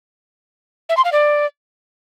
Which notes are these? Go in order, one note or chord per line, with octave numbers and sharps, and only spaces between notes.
E5
C6
F5
D5